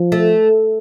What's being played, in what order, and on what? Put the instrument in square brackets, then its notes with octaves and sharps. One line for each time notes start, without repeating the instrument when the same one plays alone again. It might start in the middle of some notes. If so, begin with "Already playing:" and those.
Already playing: [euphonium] F3
[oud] A3